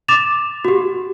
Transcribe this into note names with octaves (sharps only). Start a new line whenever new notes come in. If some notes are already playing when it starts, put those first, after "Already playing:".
D6 A6 E7 F7
F#4 G4